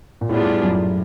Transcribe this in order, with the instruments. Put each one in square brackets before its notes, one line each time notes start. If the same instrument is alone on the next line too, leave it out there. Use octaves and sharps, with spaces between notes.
[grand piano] A#2
[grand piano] A2 [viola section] G3 B3 D4 F4 G#4
[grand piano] A2
F#2